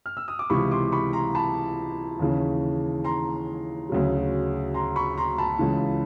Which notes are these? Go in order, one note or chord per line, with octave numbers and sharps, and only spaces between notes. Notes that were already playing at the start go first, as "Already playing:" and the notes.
F6
E6
D#6
D6
C#2 C3 E3 B5 C#6
C6 D6
B5 C#6
A#5 C6
A5 B5
D#2 C#3 E3
A#5 C6
D2 C#3 F#3
A#5 C6
B5 C#6
A#5 C6
A5 B5
C#2 C#3 E3